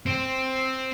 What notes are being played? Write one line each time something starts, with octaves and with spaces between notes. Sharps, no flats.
C4